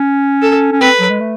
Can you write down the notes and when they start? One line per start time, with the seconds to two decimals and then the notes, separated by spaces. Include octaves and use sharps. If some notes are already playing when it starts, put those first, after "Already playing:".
Already playing: C#4
0.42 A4
0.72 C#4
0.80 C4 B4
1.00 F#3
1.10 G#3
1.20 A3